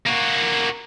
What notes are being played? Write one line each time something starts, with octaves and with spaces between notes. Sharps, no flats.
A#3 F#4